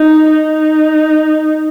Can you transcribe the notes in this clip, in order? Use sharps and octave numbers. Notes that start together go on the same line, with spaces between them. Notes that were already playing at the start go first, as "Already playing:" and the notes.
Already playing: D#4
D#4